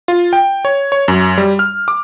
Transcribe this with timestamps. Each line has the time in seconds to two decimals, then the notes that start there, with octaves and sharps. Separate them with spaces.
0.08 F4
0.33 G5
0.65 C#5
0.92 C#5
1.08 F#2
1.38 G3
1.59 F6
1.88 D6